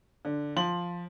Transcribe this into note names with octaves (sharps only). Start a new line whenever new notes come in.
D3
F3 C6 F#7